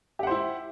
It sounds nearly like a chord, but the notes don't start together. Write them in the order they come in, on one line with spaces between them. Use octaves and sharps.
G4 F#5 C5 E4